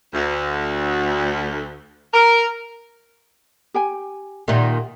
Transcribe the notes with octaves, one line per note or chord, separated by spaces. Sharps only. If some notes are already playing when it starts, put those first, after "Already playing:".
D2
A#4
G4 G5 G#5
A#2 D#3 G4 E5 F#5